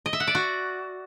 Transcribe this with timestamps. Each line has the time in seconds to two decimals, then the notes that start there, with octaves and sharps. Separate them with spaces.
0.06 D#5
0.13 E5
0.20 F#5
0.27 D5
0.35 F#4